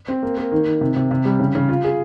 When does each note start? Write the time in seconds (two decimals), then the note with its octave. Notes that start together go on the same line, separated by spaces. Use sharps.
0.08 C4
0.23 A#3
0.37 A#3
0.52 D#3
0.66 D#3
0.81 C3
0.96 C3
1.11 C3
1.25 G3
1.40 C#3
1.55 C#3
1.69 F4
1.84 G#4